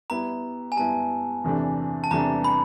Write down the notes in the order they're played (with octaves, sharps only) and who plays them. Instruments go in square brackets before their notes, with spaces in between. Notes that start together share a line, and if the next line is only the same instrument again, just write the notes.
[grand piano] G3 B3 E4 [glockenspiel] A#5
[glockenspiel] G#5
[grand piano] G3 B3 E4 [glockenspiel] A5
[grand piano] E2 C3 E3 A3 D4
[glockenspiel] A5
[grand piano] E2 C3 E3 A3 D4 [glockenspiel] A#5
[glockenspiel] B5